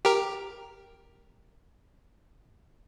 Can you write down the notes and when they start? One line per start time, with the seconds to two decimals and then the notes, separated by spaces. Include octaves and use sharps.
0.05 G4 A#4